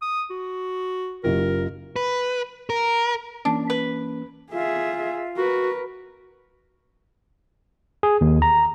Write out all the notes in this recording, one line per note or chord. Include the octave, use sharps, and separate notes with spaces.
D#6
F#4
F#1 F4 G4 A#4
B4
A#4
E3 A#3 C#4 D4
B4
F4 G#4 E5
F#4 A#4 B4
G#4
D#2
A#5